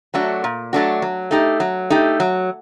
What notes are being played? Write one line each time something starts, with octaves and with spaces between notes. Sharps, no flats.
F#3 A3 D4 F#4
A#2
F#3 A3 D4 F#4
F#3
A3 D#4 G4
F#3
A3 D#4 G4
F#3